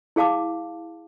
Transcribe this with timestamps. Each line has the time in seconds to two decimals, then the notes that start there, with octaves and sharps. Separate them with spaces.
0.16 E4 G#4 F5 A5 D6